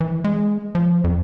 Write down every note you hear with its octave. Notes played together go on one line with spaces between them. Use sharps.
E3
G#3
F3
F2